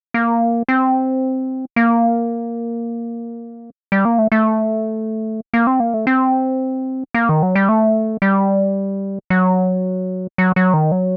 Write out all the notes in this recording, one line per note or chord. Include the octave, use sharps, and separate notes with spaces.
A#3
C4
A#3
G3
A#3
A3
A3
A#3
C4
A#3
A3
C4
A#3
D#3
F#3
G3
A3
G3
F#3
F#3
F#3
D#3
F#3